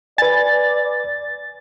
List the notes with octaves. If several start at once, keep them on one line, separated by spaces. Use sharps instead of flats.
B4 D5 G#5 A6